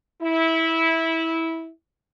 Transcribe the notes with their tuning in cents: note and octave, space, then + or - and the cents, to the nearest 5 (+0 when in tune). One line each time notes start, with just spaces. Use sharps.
E4 -15